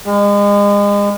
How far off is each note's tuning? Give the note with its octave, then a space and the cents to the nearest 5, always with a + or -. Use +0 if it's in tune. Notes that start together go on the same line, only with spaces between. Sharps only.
G#3 -35